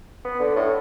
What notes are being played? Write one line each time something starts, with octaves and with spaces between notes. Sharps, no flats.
B3
D3
A2